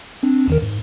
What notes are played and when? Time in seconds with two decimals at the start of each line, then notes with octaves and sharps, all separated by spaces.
0.23 C4 D4
0.48 E2 D#3 A#4
0.63 G#2